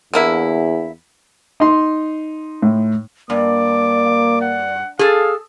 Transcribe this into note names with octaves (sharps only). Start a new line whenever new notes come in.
E2 D3 A#3 E4
D#4 C6
A2
G2 A#3 D5 D6
F#5
G#4 A4 F5